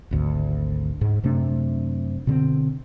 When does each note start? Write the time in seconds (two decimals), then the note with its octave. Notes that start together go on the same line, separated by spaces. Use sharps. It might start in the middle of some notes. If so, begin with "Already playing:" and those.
0.11 G#1 D2
1.01 G#2
1.23 F#2 C3 A3 D4
2.27 B2 D3 C4